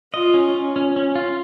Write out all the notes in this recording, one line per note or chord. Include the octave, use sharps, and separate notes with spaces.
F4 D#5
C#4
C#4
C#4
C#4
F4